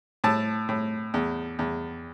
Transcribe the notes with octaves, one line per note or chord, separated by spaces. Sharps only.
A2 A5
A2
E2
E2